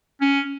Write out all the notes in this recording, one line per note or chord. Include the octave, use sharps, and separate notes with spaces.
C#4